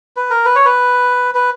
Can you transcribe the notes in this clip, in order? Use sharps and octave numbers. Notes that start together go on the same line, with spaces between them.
B4
A#4
B4
C#5
B4
B4